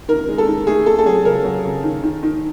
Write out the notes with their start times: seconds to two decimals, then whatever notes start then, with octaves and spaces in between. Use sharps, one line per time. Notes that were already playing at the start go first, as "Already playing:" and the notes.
0.08 D#3 A#4
0.29 G#3
0.38 A4
0.47 D#3
0.67 A3 G#4
0.86 A3 A4
0.99 A4
1.06 F#3 G#4
1.25 C#3 A#4
1.44 F#3
1.64 C#3
1.84 D#3
2.03 D#3
2.23 D#3